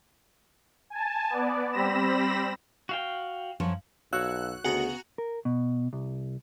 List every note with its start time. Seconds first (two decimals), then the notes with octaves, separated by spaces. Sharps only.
0.90 G#5 A5
1.30 B3 D5
1.72 G3 C4 B5 A#6 E7
2.89 F#4 F5 G5
3.60 F#2 F3 C#5
4.13 B1 F#4 C#5 F5 E6 F#6
4.64 D2 C#3 B3 F#4 G#4 F#5 G#5 A#5
5.18 A#4
5.45 B2
5.93 C2